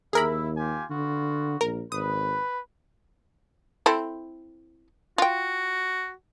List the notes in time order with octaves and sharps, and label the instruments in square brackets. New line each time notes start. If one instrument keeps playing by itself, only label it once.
[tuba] D#2 [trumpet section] E4 E5 [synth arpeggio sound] G#4 A#4 B5
[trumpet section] F4 G4 G#5
[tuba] D3 [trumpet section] B3 F4 F#4
[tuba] A#1 [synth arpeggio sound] A#4
[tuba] G#1 [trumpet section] B4 [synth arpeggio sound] D#6
[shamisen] C4 E4 A4
[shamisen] F4 G5 [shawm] F#4